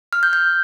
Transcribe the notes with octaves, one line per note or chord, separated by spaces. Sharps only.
F6
G6
G6